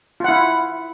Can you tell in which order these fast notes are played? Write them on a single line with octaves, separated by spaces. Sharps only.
F4 F#5 E4